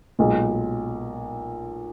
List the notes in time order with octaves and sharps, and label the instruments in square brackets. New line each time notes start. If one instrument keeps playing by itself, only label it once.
[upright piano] B1 A#2 G#3